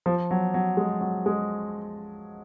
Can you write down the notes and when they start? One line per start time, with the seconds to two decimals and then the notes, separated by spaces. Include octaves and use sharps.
0.06 F3
0.31 F#3
0.54 F#3
0.77 G#3
1.01 F#3
1.26 G#3